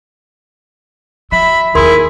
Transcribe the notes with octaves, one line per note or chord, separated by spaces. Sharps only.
F#3 E5 B5
D#2 D#3 E4 G#4 A#4 C6